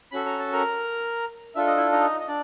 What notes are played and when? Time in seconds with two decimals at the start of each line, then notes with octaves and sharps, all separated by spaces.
0.11 C#4 F#4 A4 B5
0.26 A#5
0.39 A5
0.52 A#4 A#5
1.55 D4 F4 A4 E5
1.67 D#5
1.77 E4 E5
1.92 D#4 D#5
2.20 D#5
2.28 D4 D5